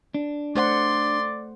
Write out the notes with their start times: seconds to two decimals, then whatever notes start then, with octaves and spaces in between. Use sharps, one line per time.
0.14 D4
0.55 A3 C5 D5 F#5 C6